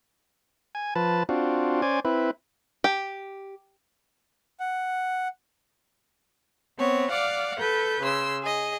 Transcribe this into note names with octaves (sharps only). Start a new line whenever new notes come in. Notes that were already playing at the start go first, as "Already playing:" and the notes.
G#5
F3 B4 A5
C4 D4 F4 F#4
C#4 C5 D5 G#5
C4 E4 B4
G4
F#5
B3 C4 C#5
D5 F5 F#5 D6
A4 B4 G6
C#3 C6 E6
G#4 D#5